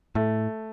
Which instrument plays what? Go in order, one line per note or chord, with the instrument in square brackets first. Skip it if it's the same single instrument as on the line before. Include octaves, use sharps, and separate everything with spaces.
[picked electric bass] A2 [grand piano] A3